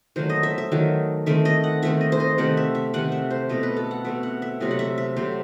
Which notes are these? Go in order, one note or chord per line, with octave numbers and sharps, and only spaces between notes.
D#3 F#3 A3 C5
D#5
E5
E5
D#3 F#3 A3
D#3 A3 C4 E5
D#5
F#5
D#3 A3 C4 E5
D#5
C5
D#5
C3 D#3 A3 C4 F#5
E5
E5
C3 D#3 A3 C4 F#5
E5
C5
B2 A3 C4 D#5
B4
A4
F#5
B2 A3 C4 E5
F#5
E5
C3 F#3 A3 C4 D#5
F#5
E5
E5
C3 F#3 A3 C4 C5